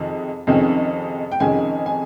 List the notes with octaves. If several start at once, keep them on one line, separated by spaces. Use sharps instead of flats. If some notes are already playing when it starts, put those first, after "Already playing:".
Already playing: F2 C3 D#3 G#3
F2 C3 D#3 G#3 C#4
G5
F2 C3 D#3 G#3 C#4 G#5
G#5